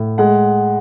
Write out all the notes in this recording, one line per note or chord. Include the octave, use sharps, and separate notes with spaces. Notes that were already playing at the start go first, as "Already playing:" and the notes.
Already playing: A2
G#3 F#5